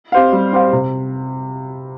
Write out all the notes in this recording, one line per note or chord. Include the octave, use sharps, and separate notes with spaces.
C4 G4 C5 F5
G3
C4 G4 C5 F5
C3